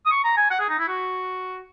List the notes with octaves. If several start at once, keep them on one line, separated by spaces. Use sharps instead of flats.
D#6
C#6
A#5
G#5
F#5
G#4
D#4
E4
F#4